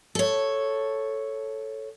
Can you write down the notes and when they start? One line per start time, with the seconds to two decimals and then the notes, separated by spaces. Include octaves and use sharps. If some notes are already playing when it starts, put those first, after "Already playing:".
0.15 A4 C#5